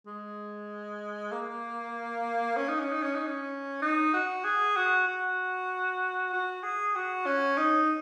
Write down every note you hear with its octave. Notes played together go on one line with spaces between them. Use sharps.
G#3
A#3
C#4
D#4
C#4
D#4
C#4
D#4
C#4
D#4
F#4
G#4
F#4
F#4
F#4
G#4
F#4
C#4
D#4